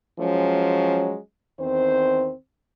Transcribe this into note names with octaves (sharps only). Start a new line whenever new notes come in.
F3 F#3 G#3 C#4
E2 D#3 C4 C5